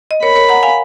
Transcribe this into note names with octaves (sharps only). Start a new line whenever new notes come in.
D#5
A#4 C#5 B5
A#4 C#5
F#5 A#5
F5 G#5